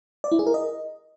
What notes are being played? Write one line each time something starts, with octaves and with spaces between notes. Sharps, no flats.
D5
E4
G#4
A#4
D#5